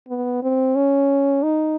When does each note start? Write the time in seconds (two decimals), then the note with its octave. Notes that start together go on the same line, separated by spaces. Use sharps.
0.08 B3
0.43 C4
0.76 C#4
1.43 D#4